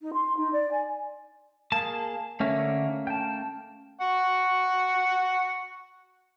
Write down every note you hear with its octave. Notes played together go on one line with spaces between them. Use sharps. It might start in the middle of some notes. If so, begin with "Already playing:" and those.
D#4
C6
D#4
D5
G#5
A#3 G#4 A5
D3 A3 A#3 C#4 C#5 E5
G5 A5
F#5 C#6